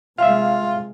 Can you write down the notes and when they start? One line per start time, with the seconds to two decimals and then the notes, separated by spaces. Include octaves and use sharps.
0.18 C3 G#3 F4 E5 F5